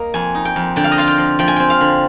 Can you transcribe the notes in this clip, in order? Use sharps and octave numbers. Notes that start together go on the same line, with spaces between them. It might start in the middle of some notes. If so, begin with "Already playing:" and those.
Already playing: A#3 D#5
F2 G#5
D#4
G5
F2
D3 G5
F5
D#5
F4 F5
G5
F3
F3 G5
G#5
C4 G5
F5
D3